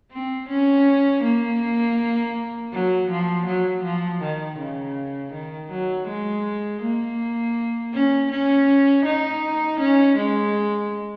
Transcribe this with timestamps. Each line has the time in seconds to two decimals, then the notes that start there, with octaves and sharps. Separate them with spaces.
0.12 C4
0.49 C#4
1.23 A#3
2.73 F#3
3.10 F3
3.47 F#3
3.84 F3
4.22 D#3
4.59 C#3
5.33 D#3
5.71 F#3
6.08 G#3
6.82 A#3
7.93 C#4
8.31 C#4
9.05 D#4
9.80 C#4
10.17 G#3